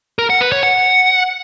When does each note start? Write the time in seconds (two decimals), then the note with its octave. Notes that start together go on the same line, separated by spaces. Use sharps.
0.19 A#4
0.30 F#5
0.41 B4
0.52 C#5
0.63 F#5